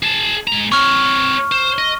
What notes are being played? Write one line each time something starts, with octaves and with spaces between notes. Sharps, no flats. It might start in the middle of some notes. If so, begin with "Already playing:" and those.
G#4 A5
G#3 A#5
C4 C#5 C#6 F6
C5
D#5